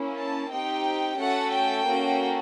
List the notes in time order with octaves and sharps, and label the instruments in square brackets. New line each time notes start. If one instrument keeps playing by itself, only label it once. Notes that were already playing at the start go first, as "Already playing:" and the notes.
Already playing: [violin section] A#3 C#4 E4
A5
C4 D#4 G4 G5
A3 C#4 F#4 A4 F#5
G5
A#3 C#4 F#4 A4